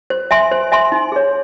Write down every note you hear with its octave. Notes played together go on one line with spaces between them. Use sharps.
C5
E5 G#5 C6
C5
E5 G#5 C6
D#4
G#4 C#5